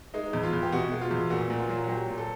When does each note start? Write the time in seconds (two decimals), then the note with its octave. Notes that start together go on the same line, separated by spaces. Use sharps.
0.14 G#3 D#4
0.33 E2
0.43 F4
0.53 E2
0.63 G4
0.72 B2 F#4
0.92 G#3
1.01 F4
1.11 E2
1.30 A#2 F#4
1.50 A#2
1.60 F4
1.69 F#3
1.84 F#4
1.88 F#3 G4
2.08 A#2
2.18 A4